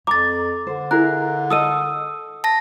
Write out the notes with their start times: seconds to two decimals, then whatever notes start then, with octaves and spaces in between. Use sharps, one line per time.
0.07 F2 A#5 D6 A6
0.67 D3 C5
0.91 E4 G#4 A#4 F#6
1.51 A4 D#5 D#6 E6 D#7
2.44 A5 A#6